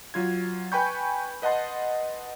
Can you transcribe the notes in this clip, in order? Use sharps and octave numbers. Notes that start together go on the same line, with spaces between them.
F#3 F4 G#6
B4 G5 G#5 B5 C#6 G6
B4 D#5 F#5 A5 C6